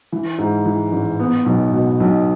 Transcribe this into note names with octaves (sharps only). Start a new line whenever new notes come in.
E3
G#2
E3
A1
B3
B1
B2
B1